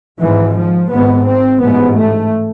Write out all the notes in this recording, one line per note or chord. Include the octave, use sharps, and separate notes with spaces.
G#1 G#2 E3
F3
G#1 G#2 B3
C4
A1 G#2 B3
A3